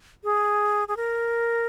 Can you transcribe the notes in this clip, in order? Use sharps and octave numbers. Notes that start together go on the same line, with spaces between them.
G#4
G#4
A#4